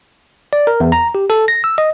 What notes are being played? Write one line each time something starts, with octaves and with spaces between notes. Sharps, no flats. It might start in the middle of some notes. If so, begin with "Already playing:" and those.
D5
A#4
E2
A#5
G4
A4
A#6
E6
D#5